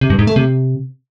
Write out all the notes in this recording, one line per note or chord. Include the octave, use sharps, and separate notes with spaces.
C3
G2
G#2
A3
C3